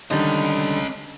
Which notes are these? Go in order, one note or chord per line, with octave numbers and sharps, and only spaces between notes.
D3 D#3 G3 C#4 D#5